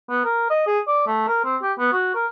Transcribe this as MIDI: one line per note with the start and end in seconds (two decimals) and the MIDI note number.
0.10 0.21 59
0.25 0.48 70
0.50 0.65 75
0.67 0.80 68
0.88 1.03 74
1.07 1.26 57
1.28 1.41 70
1.44 1.57 60
1.63 1.73 67
1.79 1.89 59
1.93 2.11 66
2.15 2.27 70